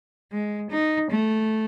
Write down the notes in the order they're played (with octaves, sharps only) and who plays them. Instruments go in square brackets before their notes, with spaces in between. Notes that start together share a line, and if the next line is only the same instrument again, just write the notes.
[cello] G#3
D#4
A3